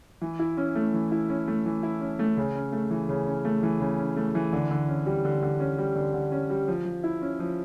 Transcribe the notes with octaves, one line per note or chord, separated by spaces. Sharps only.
E3
E4
C#4
A3
E3
E4
C#4
A3
E3
E4
C#4
A3
C#3
C#4
A3
E3
C#3
C#4
A3
E3
C#3
C#4
A3
E3
D3
D3
C#4
G3
D3
D3
C#4
G3
D3
D3
C#4
G3
F3
F3
E4
C#4
F3